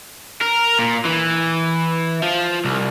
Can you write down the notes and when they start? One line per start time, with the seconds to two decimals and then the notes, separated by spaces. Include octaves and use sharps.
0.41 A#4
0.79 A#2
1.05 E3
2.23 F3
2.65 C2